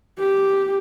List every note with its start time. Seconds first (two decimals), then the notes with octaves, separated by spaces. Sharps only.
0.19 G4